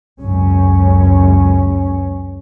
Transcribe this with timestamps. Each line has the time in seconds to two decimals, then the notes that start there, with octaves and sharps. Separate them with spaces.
0.22 C#2 F#2 C#4